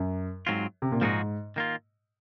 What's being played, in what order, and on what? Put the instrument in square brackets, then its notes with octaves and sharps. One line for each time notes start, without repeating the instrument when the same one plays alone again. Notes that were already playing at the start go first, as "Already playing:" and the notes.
Already playing: [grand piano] F#2
[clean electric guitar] G#2 F#3 C4 F4
[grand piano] C3
A#2
[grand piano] G#2 [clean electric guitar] F3 G#3 D#4 F#4
[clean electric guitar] D#3 A#3 F4